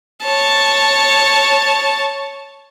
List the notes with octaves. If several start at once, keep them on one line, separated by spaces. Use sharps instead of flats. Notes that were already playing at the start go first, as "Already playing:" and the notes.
C#5 A5